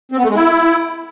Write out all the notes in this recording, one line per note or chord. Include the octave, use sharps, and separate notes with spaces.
C4
B3
A3
G#3
E4